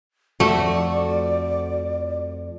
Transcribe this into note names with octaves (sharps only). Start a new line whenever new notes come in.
F2 F3 A3 F#4 D5